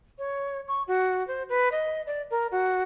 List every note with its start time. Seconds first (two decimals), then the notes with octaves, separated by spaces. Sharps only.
0.19 C#5
0.68 C#6
0.88 F#4
1.28 C5
1.49 B4
1.72 D#5
2.07 D5
2.31 A#4
2.52 F#4